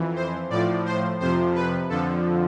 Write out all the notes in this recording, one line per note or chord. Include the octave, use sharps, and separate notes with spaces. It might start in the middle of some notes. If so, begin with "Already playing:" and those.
Already playing: F2 E3
C5
A2 F3 D5
C5
F2 C3 F3 C5
B4
F2 D3 F3 A4